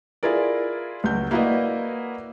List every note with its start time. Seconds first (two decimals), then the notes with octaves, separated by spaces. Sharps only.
0.23 E4 F4 G#4 A#4 D5
1.04 C#2 F#3 F#4 G6
1.31 A#3 E4 F#4 B4 D5 D#5